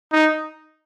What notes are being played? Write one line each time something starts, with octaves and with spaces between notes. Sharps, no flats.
D#4